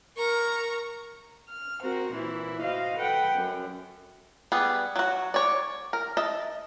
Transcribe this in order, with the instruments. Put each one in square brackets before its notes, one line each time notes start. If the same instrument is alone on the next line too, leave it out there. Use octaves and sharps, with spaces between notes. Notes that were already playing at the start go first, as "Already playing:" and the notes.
[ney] A#4 [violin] A#5 C#6
[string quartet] F6
C4 F#4 A#4 C5
A#2 E3 E4
F#4 C5 D#5 F5
A4 B4 F#5 G5
F#2
[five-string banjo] G3 B3 G#4
F#3 F#4
C#5 D5
A#4
D#5 E5 A5